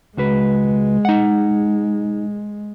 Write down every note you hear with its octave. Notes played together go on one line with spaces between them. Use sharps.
C#2 G#3 F#4 B4
D#4 F#5